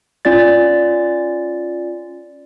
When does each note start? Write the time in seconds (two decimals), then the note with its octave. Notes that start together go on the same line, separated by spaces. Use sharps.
0.25 C#4 F4 D5 A6